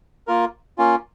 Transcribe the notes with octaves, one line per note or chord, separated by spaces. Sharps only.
A#3 F4 A#4
A#3 C#4 F4